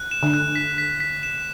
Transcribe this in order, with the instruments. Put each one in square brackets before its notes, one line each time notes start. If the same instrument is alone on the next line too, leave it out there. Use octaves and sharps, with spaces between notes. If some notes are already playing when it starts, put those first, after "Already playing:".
Already playing: [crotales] F#6
E7
[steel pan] D3
[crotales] F#6
B6
B6
B6
E7